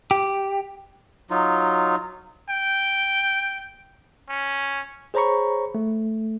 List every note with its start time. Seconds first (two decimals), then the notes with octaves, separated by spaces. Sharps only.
0.11 G4
1.30 F#3 D#4 F4
2.50 G5
4.29 C#4
5.14 G#4 C5 C#5 A#5 B5 C#6
5.75 A3